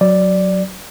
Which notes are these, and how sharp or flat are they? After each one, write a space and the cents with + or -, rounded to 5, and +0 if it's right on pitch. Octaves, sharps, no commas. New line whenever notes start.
F#3 +0 D5 +0